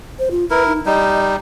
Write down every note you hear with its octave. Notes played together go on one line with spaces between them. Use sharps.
C5
F4
E4 A#4 B4
D#4
G3 D#4 D#5